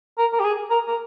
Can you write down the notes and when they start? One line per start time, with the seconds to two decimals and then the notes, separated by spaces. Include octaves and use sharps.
0.18 A#4
0.33 A#4
0.40 G4
0.44 G#4
0.70 A#4
0.88 A#4